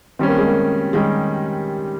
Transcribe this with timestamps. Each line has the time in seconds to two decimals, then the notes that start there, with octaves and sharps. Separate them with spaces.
0.19 D#3 G3 C4 C#4
0.28 A#3
0.38 G#3
0.47 A#3
0.93 D#3 G3 G#3 C#4